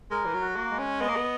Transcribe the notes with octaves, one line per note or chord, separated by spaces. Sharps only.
G#3 A#4
E3
F#3
F#4
A#3
G#3
C#4
B3 D#5
A#3
B3